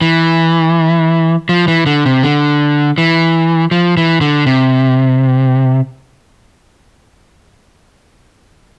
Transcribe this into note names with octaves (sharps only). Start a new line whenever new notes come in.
E3
F3
E3
D3
C3
D3
E3
F3
E3
D3
C3